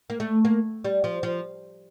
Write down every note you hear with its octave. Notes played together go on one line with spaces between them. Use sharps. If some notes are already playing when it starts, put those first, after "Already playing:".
A#3
A3
A#3
G3
F3
F3